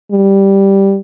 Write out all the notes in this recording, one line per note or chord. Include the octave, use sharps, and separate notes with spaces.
G3